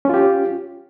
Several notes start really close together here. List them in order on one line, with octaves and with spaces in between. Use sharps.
C#4 F4 G4